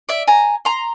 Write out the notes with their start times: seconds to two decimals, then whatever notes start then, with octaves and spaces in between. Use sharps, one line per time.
0.09 D5 E5
0.27 G#5 A#5
0.65 A#5 C6